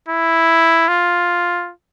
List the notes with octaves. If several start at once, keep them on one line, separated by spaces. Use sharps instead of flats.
E4
F4